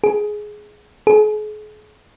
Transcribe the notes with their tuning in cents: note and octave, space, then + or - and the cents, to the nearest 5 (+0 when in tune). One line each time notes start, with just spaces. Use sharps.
G#4 +10
G#4 +40